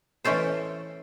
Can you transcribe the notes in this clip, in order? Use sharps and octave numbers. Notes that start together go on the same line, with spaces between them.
E3 A3 C#4 A4 C5